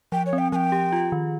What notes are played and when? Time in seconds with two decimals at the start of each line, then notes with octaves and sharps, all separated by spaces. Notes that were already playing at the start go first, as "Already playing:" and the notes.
0.12 F3 G5
0.26 C#5
0.33 C4
0.38 G5
0.52 F3 G5 G#5
0.72 G4
0.93 F4
1.12 D#3